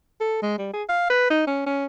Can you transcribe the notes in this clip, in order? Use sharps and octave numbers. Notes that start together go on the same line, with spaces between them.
A4
G#3
G3
G#4
F5
B4
D#4
C#4
C#4